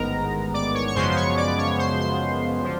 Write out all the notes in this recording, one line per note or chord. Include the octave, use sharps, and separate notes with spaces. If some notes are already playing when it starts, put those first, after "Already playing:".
Already playing: A1 G#2 D#3 G#3 B3 A#4 A#5
D5 D6
C#5 C#6
C#6
F#2 C#3 F3 G#3 B3 C5 C6
C6
C#5 C#6
D5 D6
C#5 C#6
C5 C6
C5 C6
D3 F3